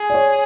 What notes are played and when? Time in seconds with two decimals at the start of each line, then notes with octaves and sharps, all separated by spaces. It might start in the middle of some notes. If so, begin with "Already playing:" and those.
Already playing: G#4
0.10 D5
0.14 C#5